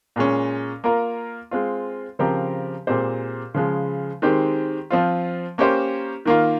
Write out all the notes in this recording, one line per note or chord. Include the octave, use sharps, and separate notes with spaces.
A#2 G#3 C#4
A#3 F4 A#4
G#3 C4 F4
C#3 F3 C4 G4 A#4
A#2 G#3 C4 G4 C5
C#3 F3 G#3
D#3 G#3 C4 G4
F3 C4 F4
A#3 C#4 G4 C5
D#3 A#3 F4